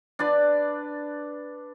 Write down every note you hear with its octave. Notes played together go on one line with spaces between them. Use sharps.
D4 B4 D5